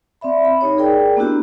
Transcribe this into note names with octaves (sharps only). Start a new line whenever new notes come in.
C4 D5 E5 B5
B5
D#4 G4 C#5
G#4 A#4 D5 G5
A#3 B3 D4 E4 F#4 G4